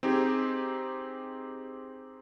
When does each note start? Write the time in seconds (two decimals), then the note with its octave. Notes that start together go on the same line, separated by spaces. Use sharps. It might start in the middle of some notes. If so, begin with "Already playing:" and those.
0.03 C4 D#4 G4 G#4